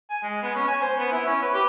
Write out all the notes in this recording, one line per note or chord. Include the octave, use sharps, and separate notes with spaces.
G#5
G#3
B3
C#4
G#5
C5
B3
E4
C#4
B4
G4